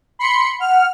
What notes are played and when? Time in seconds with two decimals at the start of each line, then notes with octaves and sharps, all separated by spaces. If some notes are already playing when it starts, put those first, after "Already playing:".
0.19 B5 C6 C#7
0.60 F#5 F6